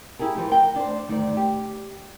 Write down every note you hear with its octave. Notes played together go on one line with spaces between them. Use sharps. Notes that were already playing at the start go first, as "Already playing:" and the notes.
E4 G4 G#4 A#4
E3 F3 G4
A#4 G5
D4 C5
D2 G2 D#3 D5
G4